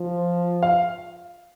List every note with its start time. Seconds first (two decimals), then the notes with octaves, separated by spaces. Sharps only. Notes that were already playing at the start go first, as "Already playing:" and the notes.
Already playing: F3
0.63 F5